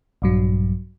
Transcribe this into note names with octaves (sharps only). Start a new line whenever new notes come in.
A#1 G2 F#3